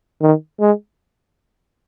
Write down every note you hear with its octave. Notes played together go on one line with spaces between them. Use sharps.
D#3
G#3